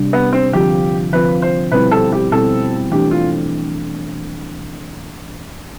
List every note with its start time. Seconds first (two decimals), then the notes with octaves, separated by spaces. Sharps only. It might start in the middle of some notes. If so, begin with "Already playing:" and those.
Already playing: C3 G3 D4
0.13 B3
0.33 C4
0.53 D3 F3 C4 F4 G4
1.12 D3 F3 C4 F4 B4
1.42 C5
1.72 B2 G3 C4 E4 B4
1.91 A4
2.12 G4
2.32 B2 G3 C4 E4 A4
2.91 E3 A3 D4 G4
3.11 F4